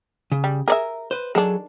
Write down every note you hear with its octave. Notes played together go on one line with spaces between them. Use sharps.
C#3
G3
G#4 A#4 D5 E5
B4 C5
D#3 F#3 D4 G#4 A4